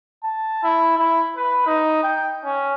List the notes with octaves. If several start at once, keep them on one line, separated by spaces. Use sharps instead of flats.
A5
E4
E4
B4
D#4
G5
C#4